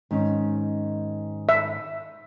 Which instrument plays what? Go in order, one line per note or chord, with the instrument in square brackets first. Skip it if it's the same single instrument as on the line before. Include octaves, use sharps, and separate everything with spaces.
[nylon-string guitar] G#2 D#3 C#4
[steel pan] E5